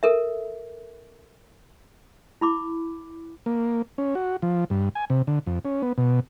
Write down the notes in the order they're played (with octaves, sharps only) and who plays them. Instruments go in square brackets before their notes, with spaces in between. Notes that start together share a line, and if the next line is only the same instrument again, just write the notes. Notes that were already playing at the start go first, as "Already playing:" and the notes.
[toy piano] A4 A#4 E5
E4 B5 D6
[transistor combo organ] A#3
C#4
F#4
F3
G2
G#5
C3
D3
F2
C#4
B3
B2